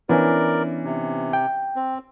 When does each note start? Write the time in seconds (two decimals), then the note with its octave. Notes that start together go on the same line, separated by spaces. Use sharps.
0.09 E3 B3 C#4 D4 A#4 D5
0.84 C3
1.33 G5
1.76 C4